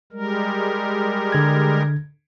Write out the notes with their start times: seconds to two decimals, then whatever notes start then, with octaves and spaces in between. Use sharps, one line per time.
0.12 G3 G#3 A#4
1.32 D3 G#6